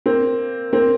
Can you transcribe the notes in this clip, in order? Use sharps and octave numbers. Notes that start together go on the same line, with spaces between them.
A#3 C4
A#3 C4